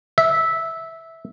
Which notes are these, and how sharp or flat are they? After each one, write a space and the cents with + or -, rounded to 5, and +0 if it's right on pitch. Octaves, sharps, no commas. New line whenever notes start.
E5 -10